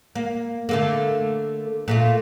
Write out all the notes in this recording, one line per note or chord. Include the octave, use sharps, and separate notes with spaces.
A#3
D3 A3 A#3
A#2 A3 F4